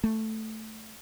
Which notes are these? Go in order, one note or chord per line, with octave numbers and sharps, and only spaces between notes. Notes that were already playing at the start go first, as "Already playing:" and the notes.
A3